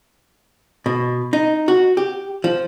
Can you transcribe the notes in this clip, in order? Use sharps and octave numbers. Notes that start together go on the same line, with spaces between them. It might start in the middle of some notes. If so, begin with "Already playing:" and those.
B2
D#4
F#4
G4
F3